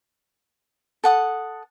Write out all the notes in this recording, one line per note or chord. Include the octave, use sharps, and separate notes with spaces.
A4 F#5 D#6